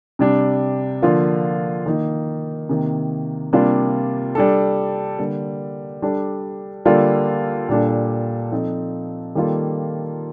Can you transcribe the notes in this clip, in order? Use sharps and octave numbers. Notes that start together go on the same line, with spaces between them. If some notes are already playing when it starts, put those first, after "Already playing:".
C3 G3 D4
D3 F3 A#3 F4
D#3 A#3 D#4
C3 D#3 A#3
C3 G3 A#3 D4 F4
G3 D4 A4
D3 G3 A#3
G3 D4 A4
D3 G3 A#3 F4 A4
A#2 G3 D4 A4
F3 C4 D#4 A4
D#3 G3 A#3 F4 A4